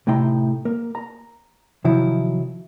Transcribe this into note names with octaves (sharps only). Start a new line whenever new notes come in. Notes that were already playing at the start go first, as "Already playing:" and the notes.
A2 C3 A3 D#4 G5 C6
A#3 A#4
A#5
C3 D#3 F3 F#3 E4